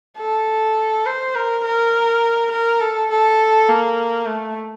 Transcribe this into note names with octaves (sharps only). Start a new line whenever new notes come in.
A4
C5
A#4
A#4
A#4
A4
A4
A#3
A3